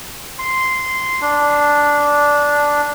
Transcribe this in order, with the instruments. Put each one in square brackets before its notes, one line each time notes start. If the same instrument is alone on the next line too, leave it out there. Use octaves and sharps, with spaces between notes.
[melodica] C6
D4